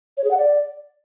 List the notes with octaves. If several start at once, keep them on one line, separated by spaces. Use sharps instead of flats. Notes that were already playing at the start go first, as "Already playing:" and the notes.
C#5
G#4
F#5
D5